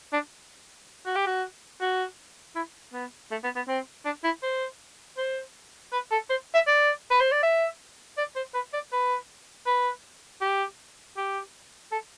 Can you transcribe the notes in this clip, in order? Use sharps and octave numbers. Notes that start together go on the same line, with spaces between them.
D4
F#4
G4
F#4
F#4
E4
B3
A3
B3
B3
C4
D4
E4
C5
C5
B4
A4
C5
E5
D5
B4
C5
D5
E5
D5
C5
B4
D5
B4
B4
G4
G4
A4